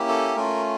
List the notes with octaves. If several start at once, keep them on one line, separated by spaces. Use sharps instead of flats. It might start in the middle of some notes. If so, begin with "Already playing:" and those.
Already playing: A#3 C#4 E4 G4
A4
A3 C#4 F4 A#4